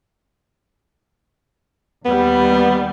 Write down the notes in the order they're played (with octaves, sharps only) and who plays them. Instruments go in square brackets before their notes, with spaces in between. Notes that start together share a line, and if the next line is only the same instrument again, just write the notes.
[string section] D#2 G3 [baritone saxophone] B3